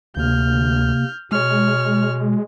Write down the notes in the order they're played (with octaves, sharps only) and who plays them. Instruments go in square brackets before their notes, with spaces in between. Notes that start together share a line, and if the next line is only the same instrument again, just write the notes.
[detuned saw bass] D2 [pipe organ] C3 A#3 [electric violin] F6 G6
[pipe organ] B2 [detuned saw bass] G#3 [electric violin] C#5 F6